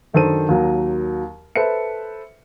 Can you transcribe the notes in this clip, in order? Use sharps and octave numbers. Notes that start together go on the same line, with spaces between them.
F#2 D#3 D4 A4 C5 D#7
D#2 F#3 A#4
A4 B4 C5 E5 C#7